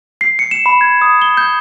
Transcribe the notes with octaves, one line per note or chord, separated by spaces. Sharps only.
C7
C#7
E7
B5
G#6
D#6
G7
G6